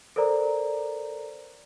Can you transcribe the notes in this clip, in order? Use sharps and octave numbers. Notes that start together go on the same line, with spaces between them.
A4 A#4 C5 D5 A#5